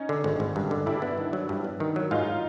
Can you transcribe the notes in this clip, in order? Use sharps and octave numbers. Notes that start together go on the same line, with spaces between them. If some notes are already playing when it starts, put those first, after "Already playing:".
Already playing: C#4 D#4
D3
G#1
G#1
G2
D3
G2 D4 E4
B3
D#3
F#3
G2
B3
D#3
F#3
G#2 D#4 F4